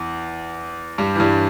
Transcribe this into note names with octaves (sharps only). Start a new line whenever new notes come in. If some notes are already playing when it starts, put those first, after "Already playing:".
Already playing: E2
G2 G3
E3
G2 G3